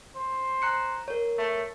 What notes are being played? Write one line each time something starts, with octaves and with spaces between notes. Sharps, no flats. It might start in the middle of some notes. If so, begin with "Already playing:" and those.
C5
A#5 F#6 C#7
A#4 C#5
A3